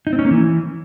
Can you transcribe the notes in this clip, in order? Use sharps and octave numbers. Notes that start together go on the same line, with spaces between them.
D#4
C4
C#4
A#3
E3